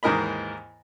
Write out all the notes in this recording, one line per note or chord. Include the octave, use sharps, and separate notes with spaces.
D#2 G#2 E3 A#4 D#5 B5